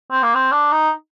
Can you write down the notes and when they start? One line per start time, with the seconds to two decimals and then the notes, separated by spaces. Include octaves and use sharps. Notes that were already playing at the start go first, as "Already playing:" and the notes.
0.11 C4
0.23 A#3
0.35 C4
0.52 D4
0.72 D#4